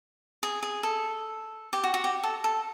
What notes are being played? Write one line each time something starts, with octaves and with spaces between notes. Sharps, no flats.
G#4
G#4
A4
G4
F#4
F#4
G4
A4
A4